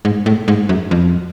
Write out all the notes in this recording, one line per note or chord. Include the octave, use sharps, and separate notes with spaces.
G#2
A2
G#2
F#2
F2